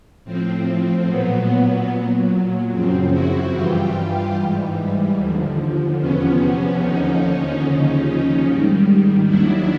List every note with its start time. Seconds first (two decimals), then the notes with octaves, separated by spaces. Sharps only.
0.24 A2 F3 C4
1.07 A#2 F#3 B3
1.89 A#2 F#3
2.71 F#2 C#3 F3 C4
3.11 E4 F#4
3.53 G2 E3 G3 F4 G4
4.35 G#2 E3 G3
5.17 D#2 D3 F3
5.99 E2 C3 F3 B3 C#4
6.80 D#2 D3 F3 C#4 D#4
7.63 D#2 C#3 F3 C#4 D#4
8.44 G#2 D#3 G3
9.26 D#2 D#3 F#3 D4 E4